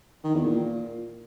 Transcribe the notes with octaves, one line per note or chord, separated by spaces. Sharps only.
D#3
E2
A#2